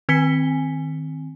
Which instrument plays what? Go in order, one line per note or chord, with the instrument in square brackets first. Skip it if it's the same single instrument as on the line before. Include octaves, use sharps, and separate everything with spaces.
[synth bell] D#3 C4 G#5 B6 C#7 G7